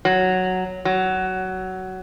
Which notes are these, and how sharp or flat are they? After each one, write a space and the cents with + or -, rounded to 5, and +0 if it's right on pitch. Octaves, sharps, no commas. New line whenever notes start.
F#3 +0
F#3 +15